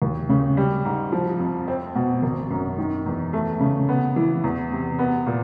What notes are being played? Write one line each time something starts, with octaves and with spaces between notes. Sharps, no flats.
D#2
C#3
G3
G#2
F3
F2
C4
B2
G#1
F#2
D#3
E2
A3
C#3
B3
E3
E2
C3
B3
A#2